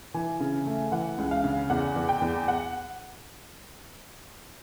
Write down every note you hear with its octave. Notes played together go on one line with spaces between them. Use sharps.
E3 G#5
C#3
A3
E3 F#5
C#2
F5
C#3
E2 F#5
E2
G5
E2
F#5